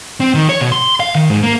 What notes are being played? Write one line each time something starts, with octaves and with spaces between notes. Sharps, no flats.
C4
D#3
C#5
B2
C6
F5
D#3
G#2
A#3